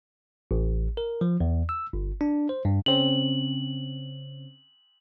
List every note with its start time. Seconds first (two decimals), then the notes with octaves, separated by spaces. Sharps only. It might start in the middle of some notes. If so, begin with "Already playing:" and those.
0.51 A1
0.97 A#4
1.21 F3
1.40 E2
1.69 E6
1.93 G1
2.21 D4
2.49 C5
2.65 G2
2.86 C#3 C4 C#4 F#7